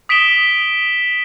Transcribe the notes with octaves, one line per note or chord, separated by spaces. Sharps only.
D#6 B6 D7 E7 G7